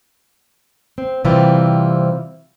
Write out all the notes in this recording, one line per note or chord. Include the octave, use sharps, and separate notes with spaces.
C4
C3 E3 G3 C4 E4 F4